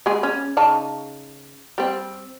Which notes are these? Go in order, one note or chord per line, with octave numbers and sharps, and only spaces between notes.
G#3 G#4
C#4
C#3 D#4 A5
G3 C4